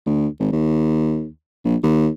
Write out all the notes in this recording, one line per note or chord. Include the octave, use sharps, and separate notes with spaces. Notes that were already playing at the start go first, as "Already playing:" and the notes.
D2
G#1
D#2
A#1
D#2